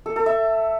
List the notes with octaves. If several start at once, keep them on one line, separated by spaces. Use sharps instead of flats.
A4
A4
E5